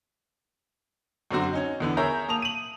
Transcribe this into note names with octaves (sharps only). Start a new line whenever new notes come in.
F#2 D3 C4 F#4
C#4 D#4
E2 D3 B3
G#4 A#4 C#5 E5 A#5 G6
A#3 A5 D#6 F7
D#7 F#7